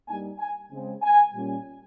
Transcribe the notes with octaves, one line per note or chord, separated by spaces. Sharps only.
G2 G3 A#3 D#4 G#5
G#5
C#3 G#3 C4
G#5
A#2 G3 C#4